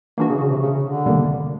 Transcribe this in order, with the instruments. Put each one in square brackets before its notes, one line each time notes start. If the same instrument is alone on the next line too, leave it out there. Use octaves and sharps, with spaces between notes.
[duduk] E3 [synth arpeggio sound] A#3 D4 F#4
[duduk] C#3
C#3
C3
C#3
D3
[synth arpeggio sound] C3 D#3 G3 A#3